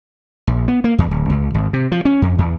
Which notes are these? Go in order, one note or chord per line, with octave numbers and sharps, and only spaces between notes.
A#1
B3
A#3
E2
D1
C#2
G#1
C3
F3
C#4
F2
E2